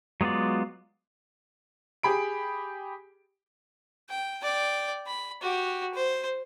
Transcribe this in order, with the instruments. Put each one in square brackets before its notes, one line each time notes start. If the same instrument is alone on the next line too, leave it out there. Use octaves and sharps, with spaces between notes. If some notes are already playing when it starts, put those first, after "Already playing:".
[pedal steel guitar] F#3 G#3 B3 F4 D5
[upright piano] G4 G#4 B5 D7
[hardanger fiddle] G5
D5 G5
B5
F#4 G4
C5